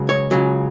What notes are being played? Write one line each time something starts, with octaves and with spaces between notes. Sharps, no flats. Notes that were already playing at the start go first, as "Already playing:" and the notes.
Already playing: C#2 C#3 F#3
C#5
C#2 C#3 F#3